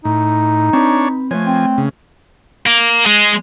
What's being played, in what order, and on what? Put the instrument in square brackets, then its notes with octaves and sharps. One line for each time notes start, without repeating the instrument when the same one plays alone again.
[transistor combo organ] A2 [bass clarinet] D#4
[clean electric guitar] C4 B4 [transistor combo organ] D4 C#5
[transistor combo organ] F3 G#5 [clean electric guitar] A3 B4 C#5
[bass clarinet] C4
[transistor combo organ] C#3
[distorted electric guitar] A#3
G#3